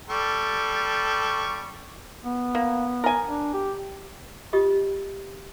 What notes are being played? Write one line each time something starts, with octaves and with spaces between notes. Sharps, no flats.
G3 A4 C#6
B3
A#3
A#4 G#5
D4
G4
F4 G4 D#5 D#6